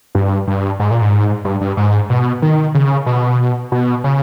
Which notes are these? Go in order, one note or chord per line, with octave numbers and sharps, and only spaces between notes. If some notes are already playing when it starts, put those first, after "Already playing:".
G2
G2
G#2
A#2
G#2
G2
G2
G#2
B2
D#3
C#3
B2
B2
C#3